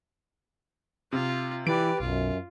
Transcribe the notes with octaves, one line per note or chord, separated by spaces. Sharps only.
C3 F4
E3 G4 B4 D5 D7
B1 F#2 F4